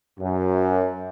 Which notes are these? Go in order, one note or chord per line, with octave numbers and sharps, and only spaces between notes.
F#2